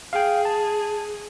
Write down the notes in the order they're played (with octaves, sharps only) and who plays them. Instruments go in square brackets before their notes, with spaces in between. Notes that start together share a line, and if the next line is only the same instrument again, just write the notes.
[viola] G#4 [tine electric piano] F5 G5
[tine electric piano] A5